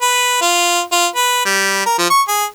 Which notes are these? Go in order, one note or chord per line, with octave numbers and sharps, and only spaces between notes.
B4
F4
F4
B4
G3
A#4
F3
C#6
G#4